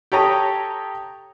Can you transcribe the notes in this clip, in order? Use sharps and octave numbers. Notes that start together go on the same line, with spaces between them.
G4 A4 C#5 A#5 D#6